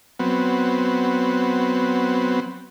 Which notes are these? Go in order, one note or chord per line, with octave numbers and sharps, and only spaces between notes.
F#3 B3 C4